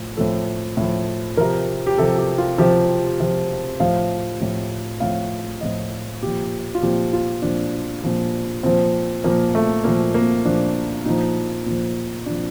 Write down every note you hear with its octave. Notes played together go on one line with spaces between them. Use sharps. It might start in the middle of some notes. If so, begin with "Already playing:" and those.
Already playing: A2 F3
A2 F3 A4
A2 F3
C3 F3 A#4
G4
C3 F3 A4
G4
F4
C3 F3 G4
C3 F3
A2 F3 F5
A2 F3
A2 F3 F5
A2 F3 D#5
A#2 F3 G4
F4
A#2 F3 G4
F4
A#2 F3 D4
A#2 F3
A#2 F3 C4
A#2 F3 A#3
A3
A#2 F3 A#3
A#3
A#2 F3 D4
A#2 F3 D#4
A#2 F3
A#2 F3 D4